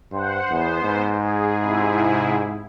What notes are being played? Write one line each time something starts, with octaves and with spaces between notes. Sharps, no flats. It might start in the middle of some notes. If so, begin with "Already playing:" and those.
G2 C5 F#5
E2 B3 C5
G#2
G#4
C3 E4 G#4